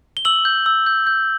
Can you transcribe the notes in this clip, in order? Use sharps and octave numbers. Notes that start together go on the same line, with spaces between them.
G7
E6 F#7
G6
E6
G6
G6